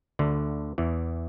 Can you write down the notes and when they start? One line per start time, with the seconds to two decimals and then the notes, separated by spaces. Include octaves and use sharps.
0.19 D2 D3
0.78 E2 E3